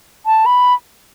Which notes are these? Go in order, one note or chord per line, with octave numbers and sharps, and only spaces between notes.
A5
B5